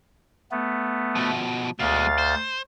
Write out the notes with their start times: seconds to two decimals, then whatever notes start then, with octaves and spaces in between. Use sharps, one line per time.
0.51 A3 B3
1.15 B2 F3
1.79 D2 B2 G#3 F5 A6
2.18 C5